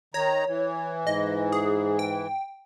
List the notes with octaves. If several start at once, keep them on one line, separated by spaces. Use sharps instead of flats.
D#3 C#5 A#5
E3
G#2 D#5
G#4
G5